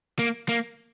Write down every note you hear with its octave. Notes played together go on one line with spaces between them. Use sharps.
A#3
A#3